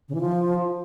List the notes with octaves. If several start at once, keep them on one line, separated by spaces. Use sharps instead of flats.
C#3
E3
F3